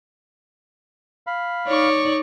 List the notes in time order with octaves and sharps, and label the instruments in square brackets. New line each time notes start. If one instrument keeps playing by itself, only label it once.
[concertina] F5 B5
[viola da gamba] D#4 D5 [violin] C#5 C#6